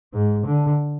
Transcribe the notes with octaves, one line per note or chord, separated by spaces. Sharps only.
G#2
D3